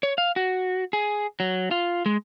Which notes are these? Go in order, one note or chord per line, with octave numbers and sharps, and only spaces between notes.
C#5
F5
F#4
G#4
F#3
F4
G#3